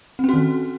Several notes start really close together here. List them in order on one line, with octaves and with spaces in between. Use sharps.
C4 C#4 F#4 D#3